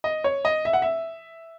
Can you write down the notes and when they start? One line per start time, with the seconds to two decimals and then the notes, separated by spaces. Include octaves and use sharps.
0.04 D#5
0.24 C#5
0.45 D#5
0.65 E5
0.73 F#5
0.82 E5